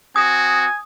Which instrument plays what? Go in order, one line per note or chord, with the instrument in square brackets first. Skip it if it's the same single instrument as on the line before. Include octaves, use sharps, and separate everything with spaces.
[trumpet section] C4 F#4 [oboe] G#5 [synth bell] D#6